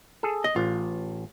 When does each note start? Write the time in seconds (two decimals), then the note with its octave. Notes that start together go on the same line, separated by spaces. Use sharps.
0.23 G#4 A4
0.44 D#5
0.56 A1 F4